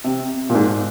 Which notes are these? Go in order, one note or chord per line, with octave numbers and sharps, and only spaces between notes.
C3
A#2
G#2